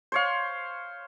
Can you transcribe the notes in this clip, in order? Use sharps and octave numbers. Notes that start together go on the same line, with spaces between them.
C5 C#5 F5